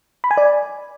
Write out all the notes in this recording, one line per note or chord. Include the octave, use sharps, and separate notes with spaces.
B5
G#5
D5